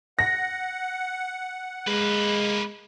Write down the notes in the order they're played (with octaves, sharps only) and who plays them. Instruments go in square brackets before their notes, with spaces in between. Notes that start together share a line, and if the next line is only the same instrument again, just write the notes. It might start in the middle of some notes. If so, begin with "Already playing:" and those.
[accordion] F#5 [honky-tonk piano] A#6
[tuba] G#3 [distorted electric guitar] A#3 B4